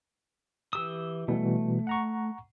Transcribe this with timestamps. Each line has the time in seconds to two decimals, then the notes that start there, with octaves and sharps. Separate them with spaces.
0.73 E3 G4 D#6 E6
1.28 B2 E3 G3 A3
1.87 F#5 A#5 C#6